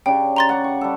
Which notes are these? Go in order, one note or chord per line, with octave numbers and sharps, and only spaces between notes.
C#3 D4 G4 G5
A#5 C6 A6
G4 C#5 F#5 A6
C#6
G3 A4